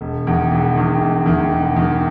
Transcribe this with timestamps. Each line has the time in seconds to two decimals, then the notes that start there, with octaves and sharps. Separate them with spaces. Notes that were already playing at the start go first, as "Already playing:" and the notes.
0.01 E1
0.27 E2 D#3
0.51 E1
0.76 E2 D#3
1.01 E1
1.26 E2 D#3
1.51 E1
1.76 E2 D#3